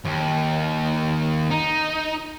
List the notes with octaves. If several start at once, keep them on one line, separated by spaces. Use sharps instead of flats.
D#2
D#4